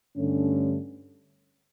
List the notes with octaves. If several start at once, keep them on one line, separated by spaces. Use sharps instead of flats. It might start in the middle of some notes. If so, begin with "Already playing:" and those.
G2 D3 A3 C#4